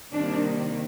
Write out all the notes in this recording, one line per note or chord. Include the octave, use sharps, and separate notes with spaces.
C3 D#3 G3 A#3 D4